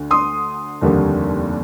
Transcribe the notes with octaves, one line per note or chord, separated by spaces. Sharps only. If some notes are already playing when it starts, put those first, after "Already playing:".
Already playing: D2 D3
C6 D#6
F1 D#2 D3 G3 A#3